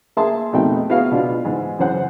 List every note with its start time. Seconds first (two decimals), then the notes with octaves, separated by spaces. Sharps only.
0.17 A#3 G#4 E5 A5 C6
0.53 F2 B2 A3 D#4 G5
0.90 B3 E4 F#4 G#4 F5
1.11 B2 D4 F4
1.45 G#2 E3
1.79 F#2 C#3 E3 C5 F#5